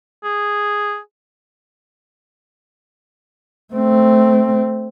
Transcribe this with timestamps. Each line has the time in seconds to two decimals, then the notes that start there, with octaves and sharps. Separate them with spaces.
0.24 G#4
3.74 A3 C4